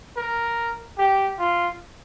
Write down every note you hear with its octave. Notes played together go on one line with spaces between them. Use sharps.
A#4
G4
F4